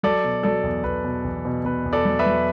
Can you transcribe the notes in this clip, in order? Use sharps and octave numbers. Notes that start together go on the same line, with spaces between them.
F#3 A4 D5
B2
F#3 A4 D5
E2
E2 B4
B2
E2
B2
B2 B4
E2
A4 D5
F#3
B4 E5
F#3